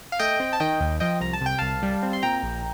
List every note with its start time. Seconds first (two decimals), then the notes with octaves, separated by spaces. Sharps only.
0.12 F5
0.19 A3 D#5 G5
0.40 C4
0.53 A5
0.60 D#3 D#5 G5
0.80 D#2
1.00 F3 D#5 G5
1.21 C2 A#5
1.33 A5
1.41 C3 G5
1.58 C2 F5 A5
1.83 G3
2.03 C4
2.13 C6
2.22 A#2 G5 A#5
2.43 A#1